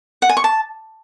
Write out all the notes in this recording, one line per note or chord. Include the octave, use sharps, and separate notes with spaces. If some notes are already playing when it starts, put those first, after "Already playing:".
F#5
G#5
C#6
A5